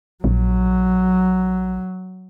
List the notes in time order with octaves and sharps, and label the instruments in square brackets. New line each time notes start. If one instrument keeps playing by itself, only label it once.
[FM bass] A#1 [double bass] F#3